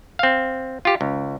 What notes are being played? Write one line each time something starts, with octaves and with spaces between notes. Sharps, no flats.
C4 F5
F4 G4
C#2